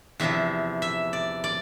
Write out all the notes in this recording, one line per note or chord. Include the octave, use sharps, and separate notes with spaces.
E2 C3 F3 E5
E5
D5
D5